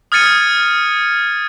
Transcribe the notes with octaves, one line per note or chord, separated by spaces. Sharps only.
D#6 F6 G#6 A6 C#7 D#7